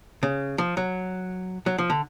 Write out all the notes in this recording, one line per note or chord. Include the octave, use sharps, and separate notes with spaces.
C#3
F3
F#3
F#3
F3
D3